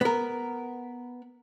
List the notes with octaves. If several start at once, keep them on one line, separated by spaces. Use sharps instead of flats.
B3 A#4